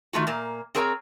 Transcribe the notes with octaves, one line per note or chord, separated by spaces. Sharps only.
D#3 A3 F4 F#4
A#2 A#3
C4 G#4 A#4 C#5 G5 A#5